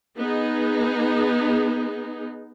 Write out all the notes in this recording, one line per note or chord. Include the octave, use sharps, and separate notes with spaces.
B3 D#4 G#4